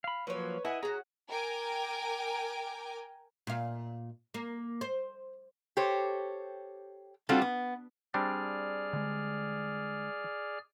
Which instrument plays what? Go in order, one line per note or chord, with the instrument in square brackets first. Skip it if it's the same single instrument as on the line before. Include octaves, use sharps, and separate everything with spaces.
[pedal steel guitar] F5 B5
[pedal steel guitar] F3 F#3 A#3 [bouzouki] B4 C#5
[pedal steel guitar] E4 [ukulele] B4 E5 [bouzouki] D#5 F#5 G#5
[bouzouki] C#4 F#4 [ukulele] G#4 [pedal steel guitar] A#5
[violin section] A#4 G5 G#5 A#5 D6 D7
[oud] A#2 F5
A#3
C5
[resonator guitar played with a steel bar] G4 A4 C5 C#5
G3 C4 D4 F4 F#4 A4
B3
[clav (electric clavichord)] G3 C4 D4 [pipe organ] G#4 D5 F6
[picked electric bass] D3 G#3